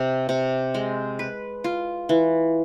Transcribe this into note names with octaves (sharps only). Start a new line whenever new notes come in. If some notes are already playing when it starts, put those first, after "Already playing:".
Already playing: C3
C3
G#3
B4
F4
E3